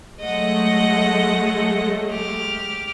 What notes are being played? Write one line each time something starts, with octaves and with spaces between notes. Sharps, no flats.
F#3 G#3 A3 D#5 F#5
G4 F6